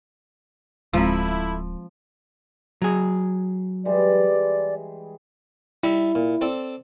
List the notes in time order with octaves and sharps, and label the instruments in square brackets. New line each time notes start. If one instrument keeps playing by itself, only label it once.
[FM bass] D1 [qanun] F3 [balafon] G#3 C4 [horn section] A3 E4
[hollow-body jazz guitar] F#3 G#4
[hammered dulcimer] E3 G3 G#3 [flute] D5
[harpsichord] G3 D#4 E5 [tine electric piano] E4
[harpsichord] A#2
C4 A4 D5